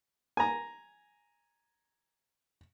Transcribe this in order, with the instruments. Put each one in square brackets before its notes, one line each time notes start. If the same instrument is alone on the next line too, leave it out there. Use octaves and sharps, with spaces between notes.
[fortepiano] G#5 A#5